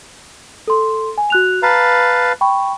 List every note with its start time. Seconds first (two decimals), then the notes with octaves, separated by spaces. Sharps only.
0.68 A4 C6
1.18 G#5
1.30 F#4 F#6 F7
1.63 B4 F5 A5 A#5
2.41 G5 B5 C#6